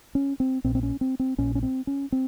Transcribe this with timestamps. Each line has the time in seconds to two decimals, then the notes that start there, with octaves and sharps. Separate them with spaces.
0.15 C#4
0.40 C4
0.64 A#1 A#2 C4
0.75 C4
0.83 C#4
1.01 C4
1.20 C4
1.38 A#1 A#2 C#4
1.55 C#4
1.63 C4
1.87 C#4
2.12 C4